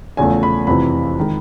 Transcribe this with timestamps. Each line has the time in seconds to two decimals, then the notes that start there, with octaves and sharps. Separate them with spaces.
0.17 E2 C#3 F3 A3 G#5
0.43 B5
0.67 F2 C3 E3 B5
1.20 D#3 G#3